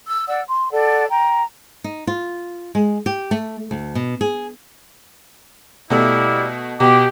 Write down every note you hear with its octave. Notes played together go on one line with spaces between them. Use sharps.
E6
D5 F#5 E6
C6
A4 D5 F#5
G5 A#5
D#4
F4
G#3
G4
A3
D2
B2
G#4
B2 G3 A3 A#3 E4
B2 G4